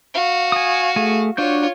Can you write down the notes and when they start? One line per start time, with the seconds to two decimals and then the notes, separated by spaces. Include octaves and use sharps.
0.14 F#4 F5
0.52 G#5 D#6
0.96 A3 G#4 G#5
1.37 D4 F4 F#4 C#5 G6